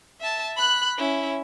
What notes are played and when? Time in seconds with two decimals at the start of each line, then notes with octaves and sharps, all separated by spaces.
0.21 E5 A5
0.56 B5 F#6
0.98 C#4 E4